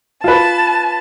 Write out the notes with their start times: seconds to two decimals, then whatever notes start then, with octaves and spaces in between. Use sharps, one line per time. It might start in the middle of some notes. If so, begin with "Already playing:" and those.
0.24 F4 B4 A5